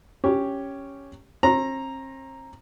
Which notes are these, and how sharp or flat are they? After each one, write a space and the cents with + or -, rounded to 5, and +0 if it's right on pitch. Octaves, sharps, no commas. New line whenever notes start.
C#4 +0 G4 +0 C#5 +0
C4 +40 C5 +45 A#5 +0